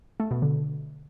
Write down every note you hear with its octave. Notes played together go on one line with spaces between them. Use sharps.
A3
B2
D3